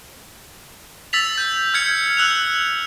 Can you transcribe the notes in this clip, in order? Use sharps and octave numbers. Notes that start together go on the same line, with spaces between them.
E6 A6 B6 F7
G6
F6 G#6 C#7
E6 F#6 F7